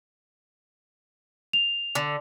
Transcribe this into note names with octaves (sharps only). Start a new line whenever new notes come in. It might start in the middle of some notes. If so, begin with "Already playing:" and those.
F7
D3